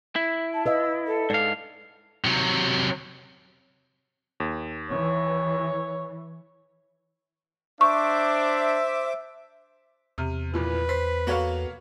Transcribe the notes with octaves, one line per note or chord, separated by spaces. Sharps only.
E4
A5
B4 D#5 F5 E6
A4
G#2 D5 F5
C3 F#3
D#2
E3 C#5
D4 C5 E5 C#6 D6
E2 C3 F6
F2 A#2 E3 B4
C5 B6
A#3 B3 F#4 A4 C#5 F5